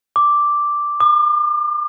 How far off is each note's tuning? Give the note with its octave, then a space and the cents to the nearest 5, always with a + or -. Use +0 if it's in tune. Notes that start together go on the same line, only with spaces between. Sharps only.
D6 +0
D6 +40